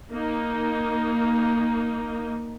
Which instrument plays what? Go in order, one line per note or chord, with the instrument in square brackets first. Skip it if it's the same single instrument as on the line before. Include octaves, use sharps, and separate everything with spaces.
[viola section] A#3 D#4